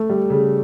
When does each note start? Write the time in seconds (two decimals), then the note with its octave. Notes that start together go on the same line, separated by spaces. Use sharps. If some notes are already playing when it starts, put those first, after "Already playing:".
Already playing: A3
0.10 G3
0.30 C#3